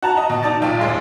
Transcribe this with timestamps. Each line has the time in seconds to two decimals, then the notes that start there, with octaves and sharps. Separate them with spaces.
0.02 F#4 A5 A#5
0.17 D#5
0.30 B2
0.43 D#4 D5 A5 A6
0.61 B1 A#2 G5
0.80 A1 D#2 G#3 C6